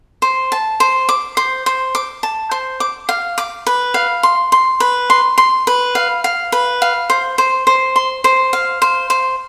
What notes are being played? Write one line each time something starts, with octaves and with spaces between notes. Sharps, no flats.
C5
A5
C5
D6
C5
C5
D6
A5
C5
D6
F5
D6
B4
F5
C6
C6
B4
C6
C6
B4
F5
F5
B4
F5
C5
C5
C5
C6
C5
F5
C5
C5